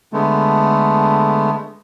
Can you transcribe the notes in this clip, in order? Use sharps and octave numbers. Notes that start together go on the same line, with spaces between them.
D3 G#3 A3 B3